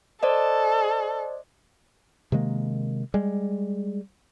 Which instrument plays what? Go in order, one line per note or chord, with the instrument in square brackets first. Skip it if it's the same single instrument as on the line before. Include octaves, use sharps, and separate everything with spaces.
[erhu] A4 [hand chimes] C5 D5 D#5
[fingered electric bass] C3 D#3 G#3 A#3
G3 G#3